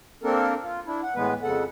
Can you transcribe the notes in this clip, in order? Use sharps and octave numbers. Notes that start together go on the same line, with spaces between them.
A#3 C4 D4 A4 A#4
F4
D4 E4
F#5
A2 E3 G#3 B3 B4
F2 C#3 A4 F#5